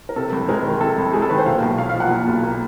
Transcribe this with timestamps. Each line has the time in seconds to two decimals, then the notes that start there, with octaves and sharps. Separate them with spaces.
0.09 A#4
0.16 C3 A4
0.32 C2
0.49 G#3 A#4
0.65 D#3
0.81 C3 A4
0.98 C2
1.13 G#3 G#4
1.22 A4
1.30 D#3 B4
1.38 C5
1.46 A#2 F5
1.62 B1
1.78 A#3 F5
1.89 F5
1.95 F3 F#5
2.11 A#2
2.28 B1
2.44 A#3